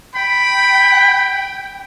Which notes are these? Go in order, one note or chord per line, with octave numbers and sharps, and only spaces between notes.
G5 B5